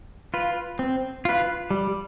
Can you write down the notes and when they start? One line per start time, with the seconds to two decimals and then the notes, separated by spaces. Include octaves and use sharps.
0.34 F4 B4
0.79 C4
1.25 F4 B4
1.71 G3